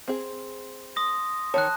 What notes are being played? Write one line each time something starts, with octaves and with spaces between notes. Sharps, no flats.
C4 G#4
C6 D#6 A#6
D#3 C#5 A5 F#6